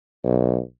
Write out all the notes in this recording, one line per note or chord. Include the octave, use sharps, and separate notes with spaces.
B1